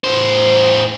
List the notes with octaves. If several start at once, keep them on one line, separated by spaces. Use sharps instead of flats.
A2 C5